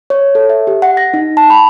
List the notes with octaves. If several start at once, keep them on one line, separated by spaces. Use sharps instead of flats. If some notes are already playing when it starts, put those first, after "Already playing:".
C#5
A4
E5
G4
F#5
A#6
D#4
A5
B5